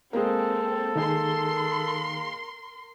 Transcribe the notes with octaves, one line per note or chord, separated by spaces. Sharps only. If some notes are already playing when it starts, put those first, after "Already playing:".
G#3 A#3 C4 A4
D#3 D#4 G#4 A#4 C6